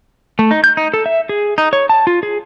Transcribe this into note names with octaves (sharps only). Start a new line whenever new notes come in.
A3
D#4
G6
D#4
A4
E5
G#4
D#4
C#5
A5
F4
G#4